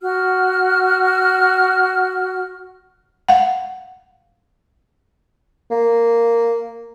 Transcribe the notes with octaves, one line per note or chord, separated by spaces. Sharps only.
F#4 F6
F5 F#5
A#3